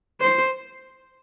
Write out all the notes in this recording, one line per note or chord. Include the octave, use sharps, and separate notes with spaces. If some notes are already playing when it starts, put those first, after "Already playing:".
C5